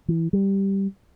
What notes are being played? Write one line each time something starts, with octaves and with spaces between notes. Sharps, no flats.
E3
G3